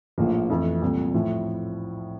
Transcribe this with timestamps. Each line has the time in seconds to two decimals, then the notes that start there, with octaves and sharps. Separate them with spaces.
0.18 A#1 A2 F3 A#3
0.50 F2 E3 A3
0.82 C2 A#2 A3
1.13 A2 F3 A3 E4